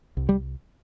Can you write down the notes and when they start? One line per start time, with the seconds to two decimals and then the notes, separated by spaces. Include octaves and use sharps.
0.17 C2
0.29 G3